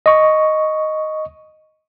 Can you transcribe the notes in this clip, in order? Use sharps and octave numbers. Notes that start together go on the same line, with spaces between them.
D#5 C#6